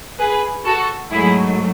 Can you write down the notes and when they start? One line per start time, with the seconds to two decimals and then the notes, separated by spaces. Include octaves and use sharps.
0.19 G#4 B4
0.65 F#4 A4
1.11 G#2 F#3 A3 E4 G#4